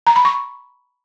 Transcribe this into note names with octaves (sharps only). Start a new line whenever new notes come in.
A#5
B5
C#6